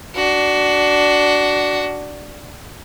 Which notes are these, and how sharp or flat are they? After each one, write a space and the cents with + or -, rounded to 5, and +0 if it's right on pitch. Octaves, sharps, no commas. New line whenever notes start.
D4 +0 F#4 +20